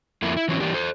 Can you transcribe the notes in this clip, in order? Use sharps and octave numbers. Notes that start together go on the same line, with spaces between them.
F2 A#3 E4
E4
E3 F#3 C4 C#4 E4
E3 G3 A#3 D4 G4
A4 C5